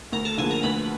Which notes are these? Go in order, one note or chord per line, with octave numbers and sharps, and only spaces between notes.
D2 A#4
A4
D3 F3 A#3 G#4
A#4
D2 B4